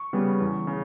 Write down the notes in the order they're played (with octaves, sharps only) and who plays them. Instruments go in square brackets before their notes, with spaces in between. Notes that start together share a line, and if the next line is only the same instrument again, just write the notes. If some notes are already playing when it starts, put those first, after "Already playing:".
Already playing: [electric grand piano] C#6
C#3 G3 B3
E2
C#3